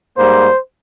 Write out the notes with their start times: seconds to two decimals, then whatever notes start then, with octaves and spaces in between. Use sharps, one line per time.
0.16 G#2 G3 A#3 C5